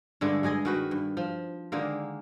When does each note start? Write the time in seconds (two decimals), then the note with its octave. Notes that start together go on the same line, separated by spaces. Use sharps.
0.21 G2 D3 G#3 A3
0.43 G2 G#3 G#4 D#5
0.65 D#3 F#4 B4
0.91 G2
1.17 F3
1.72 D3 D#3 G#3 A#3